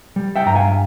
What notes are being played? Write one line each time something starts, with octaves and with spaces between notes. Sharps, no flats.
G3
E5 G5
G2 A#5
F5 G#5